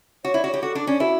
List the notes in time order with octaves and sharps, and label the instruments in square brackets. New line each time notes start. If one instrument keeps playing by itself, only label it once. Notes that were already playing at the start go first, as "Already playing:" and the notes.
[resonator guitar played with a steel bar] F#4 [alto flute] C#5
[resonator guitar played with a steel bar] E4
[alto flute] D5
[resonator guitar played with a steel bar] F#4
[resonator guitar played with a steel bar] G4 [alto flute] C#5
[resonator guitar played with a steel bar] F#4 [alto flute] A4
[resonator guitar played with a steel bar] D4
[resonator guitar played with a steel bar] C#4 [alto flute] D5
[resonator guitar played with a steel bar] E4 [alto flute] F#4